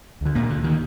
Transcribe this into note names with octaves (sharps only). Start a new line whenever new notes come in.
D2 D3
A#2 A#3
D3
D#3